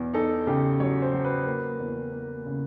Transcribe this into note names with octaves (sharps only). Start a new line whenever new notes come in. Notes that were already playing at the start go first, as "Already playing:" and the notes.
Already playing: E2 B2
D#4 A4
C#3 G4
F#3 C#5
C5
F#3
B4
A#3
E2
A#3
C#3